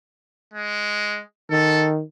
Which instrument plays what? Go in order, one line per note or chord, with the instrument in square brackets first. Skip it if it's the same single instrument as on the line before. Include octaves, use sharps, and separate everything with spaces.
[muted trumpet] G#3
[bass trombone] D#3 [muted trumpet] A4